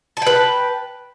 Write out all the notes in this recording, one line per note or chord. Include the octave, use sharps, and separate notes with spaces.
B4 G5 A5